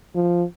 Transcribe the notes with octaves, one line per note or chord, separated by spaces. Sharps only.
F3